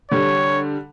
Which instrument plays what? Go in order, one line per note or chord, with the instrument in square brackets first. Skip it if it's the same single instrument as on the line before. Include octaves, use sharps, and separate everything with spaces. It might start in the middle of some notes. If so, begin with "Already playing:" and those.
[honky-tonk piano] D3 G3 [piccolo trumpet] C#5